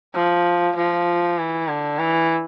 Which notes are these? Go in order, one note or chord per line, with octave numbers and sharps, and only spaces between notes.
F3
F3
E3
D3
E3